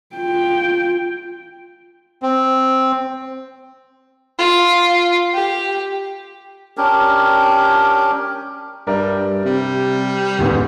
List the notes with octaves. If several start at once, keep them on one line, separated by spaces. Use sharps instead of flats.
F4 G5
C4
F4
G4
C#4 D4 G4 A#4
G2 G3 A#4 D5 E5
C3 G3
D#1 D2 G#2 B3